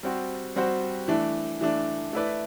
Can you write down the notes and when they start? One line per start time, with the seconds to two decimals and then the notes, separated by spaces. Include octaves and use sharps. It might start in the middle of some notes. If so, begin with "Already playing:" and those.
0.03 G3 C4 F#4 C5
0.56 G3 C4 F#4 C5
1.08 E3 A3 D4
1.61 E3 A3 D4
2.13 A3 E4 B4 D5